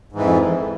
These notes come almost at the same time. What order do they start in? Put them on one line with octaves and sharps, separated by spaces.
G#2 E3 F2